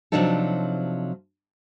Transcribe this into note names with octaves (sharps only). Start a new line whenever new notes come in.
C3 F3 F#3 D4 D#4 A4